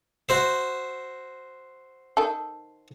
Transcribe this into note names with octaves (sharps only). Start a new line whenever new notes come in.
F#4 C5 E5
D#3 A4